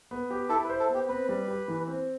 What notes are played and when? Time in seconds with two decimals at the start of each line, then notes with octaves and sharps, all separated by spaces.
0.11 B3
0.30 G4
0.49 E4 A4
0.64 B4
0.70 C5
0.80 A4
0.89 B3
0.94 G4
1.09 C4 B4
1.29 G3
1.48 G4
1.68 E3
1.88 C4